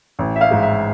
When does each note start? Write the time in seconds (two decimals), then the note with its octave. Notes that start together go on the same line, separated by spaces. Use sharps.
0.19 A1
0.36 E5
0.41 F5
0.51 G#2
0.62 E5